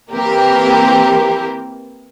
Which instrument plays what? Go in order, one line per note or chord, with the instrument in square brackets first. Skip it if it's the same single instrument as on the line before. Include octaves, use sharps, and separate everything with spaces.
[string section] E3 A#3 C4 G4 A#4